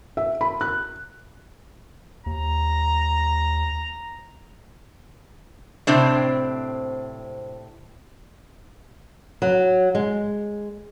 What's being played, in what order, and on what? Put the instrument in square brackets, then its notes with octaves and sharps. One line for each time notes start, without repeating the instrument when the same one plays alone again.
[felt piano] E5
B5
F#6
[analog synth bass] D#2 [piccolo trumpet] A#5
[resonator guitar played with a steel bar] A2 C3 C4 D4
[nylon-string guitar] F#3
G#3